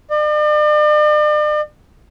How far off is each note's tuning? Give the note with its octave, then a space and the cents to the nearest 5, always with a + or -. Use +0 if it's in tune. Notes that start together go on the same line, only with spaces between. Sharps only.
D5 +40